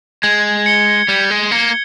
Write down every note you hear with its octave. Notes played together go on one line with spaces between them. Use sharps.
G#3 G#6
C#7 G7
G3 G#6
G#3
A#3 C#7 G7